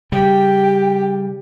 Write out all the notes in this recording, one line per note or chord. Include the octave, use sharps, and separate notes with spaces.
C#3 G3 G4 G5